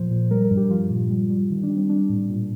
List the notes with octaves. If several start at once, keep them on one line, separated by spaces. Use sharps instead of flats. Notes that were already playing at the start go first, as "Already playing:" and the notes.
Already playing: A#2 F3 C5
A#2
G3 A#4
A#4
G2
G4
F3 F4
A#2
G3
G3
D#3
D4
G3
C4
G3 D4
A2
A#2